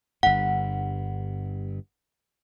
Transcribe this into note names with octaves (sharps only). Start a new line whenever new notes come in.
G1 G2 F#5